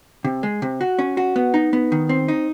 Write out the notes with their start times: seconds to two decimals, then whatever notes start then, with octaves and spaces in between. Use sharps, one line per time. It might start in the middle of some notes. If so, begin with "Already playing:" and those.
0.24 C3
0.43 G#3
0.62 C3
0.81 F#4
0.99 C#4
1.17 F#4
1.36 B3
1.54 D#4
1.73 B3
1.92 D#3
2.09 C4
2.28 D#4